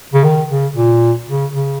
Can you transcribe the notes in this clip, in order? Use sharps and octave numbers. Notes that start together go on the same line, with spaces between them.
C#3
D#3
C#3
A#2
C#3
C#3